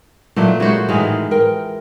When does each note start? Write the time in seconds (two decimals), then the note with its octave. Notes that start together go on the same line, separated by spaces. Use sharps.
0.36 A#2 F#3 A3 A#3 E4
0.60 F#3 G#3 D#4 E4 F#4 C5
0.89 A2 D#3 E3 G#3 F5
1.31 A#4 G5